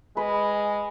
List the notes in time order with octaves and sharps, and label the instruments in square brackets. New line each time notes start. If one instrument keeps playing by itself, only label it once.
[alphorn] G#3 [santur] B4